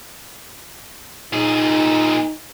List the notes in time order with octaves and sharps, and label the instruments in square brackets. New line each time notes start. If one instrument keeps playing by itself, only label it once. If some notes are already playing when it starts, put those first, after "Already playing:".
[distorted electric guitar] A#2 G#4 [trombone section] D#4